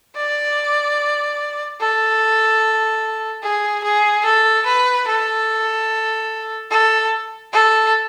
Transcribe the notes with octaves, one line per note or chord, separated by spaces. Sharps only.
D5
A4
G#4
G#4
A4
B4
A4
A4
A4